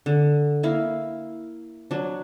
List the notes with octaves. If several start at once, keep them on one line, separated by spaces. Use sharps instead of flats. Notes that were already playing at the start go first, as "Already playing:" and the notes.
D3
A#3 E4 F5
F#3 D4